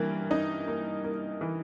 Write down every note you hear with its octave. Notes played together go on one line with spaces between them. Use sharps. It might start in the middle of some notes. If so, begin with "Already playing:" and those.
Already playing: G2 E3 A#3
D#4
A#3
A#3
E3